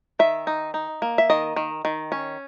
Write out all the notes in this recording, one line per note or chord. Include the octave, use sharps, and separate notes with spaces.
D#3 E5
D#4
D#4
A#3
E5
D#3 D#5
D#3
D#3
C#4